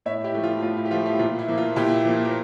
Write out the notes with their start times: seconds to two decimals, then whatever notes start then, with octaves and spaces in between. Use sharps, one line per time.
0.06 A2 C#5 E5
0.24 E4 G4
0.34 F3 A3
0.44 F4
0.62 A2 F4
0.77 E4
0.85 G4
0.91 F3 A3 F4
1.06 E4 G4
1.19 A#2 F4
1.39 E4
1.48 F3 A#3
1.58 F4
1.76 A#2 E4 G4
2.05 F3 A#3
2.25 A#4